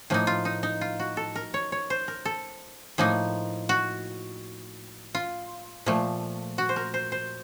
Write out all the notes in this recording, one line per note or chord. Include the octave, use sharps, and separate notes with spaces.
A2 F3 A#3 D#4
F4
D#4
D#4
F4
F#4
A4
A#4
C#5
C#5
C5
A#4
A4
A2 F3 A#3 D#4
F#4
F4
A#2 F3 A3
F#4
C5
A#4
C5
C5